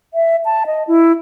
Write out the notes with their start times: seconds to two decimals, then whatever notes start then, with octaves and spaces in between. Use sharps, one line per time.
0.14 E5
0.45 A5
0.66 D#5
0.88 E4